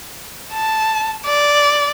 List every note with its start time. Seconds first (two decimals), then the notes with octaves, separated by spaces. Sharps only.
0.53 A5
1.26 D5